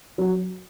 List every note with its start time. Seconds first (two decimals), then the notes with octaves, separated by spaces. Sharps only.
0.18 F#3